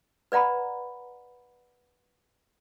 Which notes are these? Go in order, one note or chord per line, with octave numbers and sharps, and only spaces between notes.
B4 D5 F#5 A#5 B5